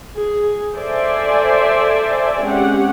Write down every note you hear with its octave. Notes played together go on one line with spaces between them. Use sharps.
G#4
A4 C5 D5 E5 G#5
G#3 C4 C#4 G4 F#5